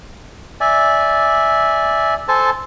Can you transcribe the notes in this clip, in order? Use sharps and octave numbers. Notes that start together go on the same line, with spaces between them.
D5 E5 G#5
A4 C5 G#5 A5